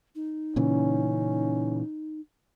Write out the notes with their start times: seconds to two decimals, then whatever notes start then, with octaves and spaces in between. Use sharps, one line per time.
0.15 D#4
0.56 A#2 C#3 E3 C#4